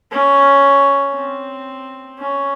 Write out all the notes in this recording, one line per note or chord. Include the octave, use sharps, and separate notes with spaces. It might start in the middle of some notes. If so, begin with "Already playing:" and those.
C#4
C4
C#4